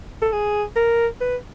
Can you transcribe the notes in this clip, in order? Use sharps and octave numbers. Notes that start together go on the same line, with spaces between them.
A4
G#4
A#4
B4